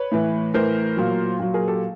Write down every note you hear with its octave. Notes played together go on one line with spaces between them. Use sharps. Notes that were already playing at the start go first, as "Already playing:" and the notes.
Already playing: B4 C#5
A2 E3
A2 E3 A#4 C5
A#2 F#3
A#2 F#3
G#4 A#4
G4 A4